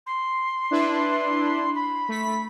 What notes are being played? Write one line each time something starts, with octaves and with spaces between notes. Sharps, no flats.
C6
D4 E4 B4
B5
A3 B6